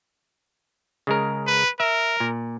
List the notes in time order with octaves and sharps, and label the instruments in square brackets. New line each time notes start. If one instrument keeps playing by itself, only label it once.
[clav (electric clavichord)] C#3 G#3 A#4
[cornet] B4
[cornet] A#4 [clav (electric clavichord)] E5
[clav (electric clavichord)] A#2